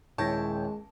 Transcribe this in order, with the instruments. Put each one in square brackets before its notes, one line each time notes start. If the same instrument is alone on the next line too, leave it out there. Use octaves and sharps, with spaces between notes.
[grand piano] D#1 E4 A#6 [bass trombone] G#3 [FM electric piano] C#5 G5 [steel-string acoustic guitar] A5